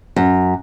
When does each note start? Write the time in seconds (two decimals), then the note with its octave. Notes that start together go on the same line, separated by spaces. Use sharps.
0.16 F#2